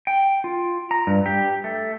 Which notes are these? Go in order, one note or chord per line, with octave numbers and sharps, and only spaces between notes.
G5
F4
A#5
G2
G4
A3